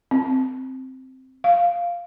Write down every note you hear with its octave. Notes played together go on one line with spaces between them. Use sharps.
C4
F5